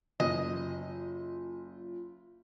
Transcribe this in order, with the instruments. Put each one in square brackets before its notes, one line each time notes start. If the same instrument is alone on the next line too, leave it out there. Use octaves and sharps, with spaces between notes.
[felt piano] F#1 [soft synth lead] F4 [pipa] D#5